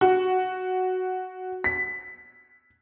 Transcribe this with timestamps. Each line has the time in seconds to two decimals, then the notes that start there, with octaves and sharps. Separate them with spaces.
0.01 F#4
1.64 B6